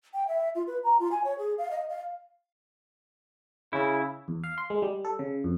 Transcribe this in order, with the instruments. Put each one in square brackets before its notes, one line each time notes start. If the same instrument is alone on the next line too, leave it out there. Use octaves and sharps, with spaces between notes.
[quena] G5
E5
F4
B4
A#5
F4
G#5
C#5
G#4
F5
D#5
F5
[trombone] C#3 [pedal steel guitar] E4
[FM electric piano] E2
F5
C6
G#3
G3
A4
C#3
F2